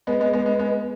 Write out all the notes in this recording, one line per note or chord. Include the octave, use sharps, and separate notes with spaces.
G#3 B3
G#3 B3
G#3 B3
G#3 B3
G#3 B3